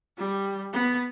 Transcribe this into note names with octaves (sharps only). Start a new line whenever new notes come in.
G3
B3